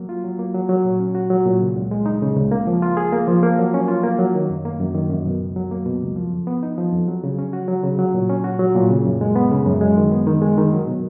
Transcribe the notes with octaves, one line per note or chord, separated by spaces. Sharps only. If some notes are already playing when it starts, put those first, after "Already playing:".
Already playing: F#3 A#3
F4
F#3
A#3
F#3
F#3
A#2
C#4
F#4
F#3
A#2
C#3
C#2
G#3
D#4
C#3
C#2
A#3
F3
F4
G#4
A#3
F3
A#3
F#3
C#4
F4
A#3
F#3
D#3
F#2
A#3
F#2
D#3
F#2
B2
C#2
F#3
A#3
B2
C#2
F3
F2
B3
D#4
F3
F2
F#3
C#3
C#4
F#4
F#3
C#3
F#3
A#2
C#4
F#4
F#3
A#2
C#3
F#2
G#3
B3
C#3
F#2
G#3
D#3
B3
D#3
G#3
D#3
F#3
B2